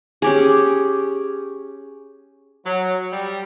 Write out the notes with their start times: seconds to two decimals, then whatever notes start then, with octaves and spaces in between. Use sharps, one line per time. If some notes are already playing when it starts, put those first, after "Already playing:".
0.22 C#4 G4 G#4
2.66 F#3
3.12 G3